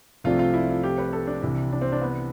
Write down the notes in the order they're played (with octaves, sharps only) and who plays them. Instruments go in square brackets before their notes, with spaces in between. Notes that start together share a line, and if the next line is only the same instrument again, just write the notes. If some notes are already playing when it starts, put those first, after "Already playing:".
[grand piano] C2 C3 F3 A3 D4 [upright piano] F4
[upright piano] F4
E4
F4
G4
B4
A4
D4
[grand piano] C2 C3 E3
[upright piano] D4
C4
D4
B3